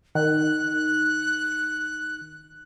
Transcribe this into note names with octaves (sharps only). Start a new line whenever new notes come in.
D#3 F#6